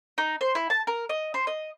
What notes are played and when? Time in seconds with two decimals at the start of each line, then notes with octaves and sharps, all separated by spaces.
0.18 D#4
0.41 C5
0.55 E4
0.70 A5
0.87 A#4
1.09 D#5
1.34 C5
1.47 D#5